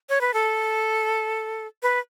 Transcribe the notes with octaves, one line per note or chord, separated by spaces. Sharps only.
C#5
B4
A4
B4